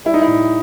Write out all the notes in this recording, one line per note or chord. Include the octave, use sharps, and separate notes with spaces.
G3 E4
D#4
E4
A2